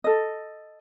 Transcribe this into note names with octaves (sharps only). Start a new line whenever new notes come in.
A4 D#5